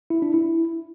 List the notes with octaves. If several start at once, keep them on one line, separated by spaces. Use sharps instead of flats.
E4
D4
E4